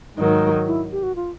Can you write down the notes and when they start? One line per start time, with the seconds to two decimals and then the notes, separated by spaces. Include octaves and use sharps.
0.16 G#2 D#3 F#3 D#4
0.66 E4
0.91 G4
1.03 F#4
1.15 F4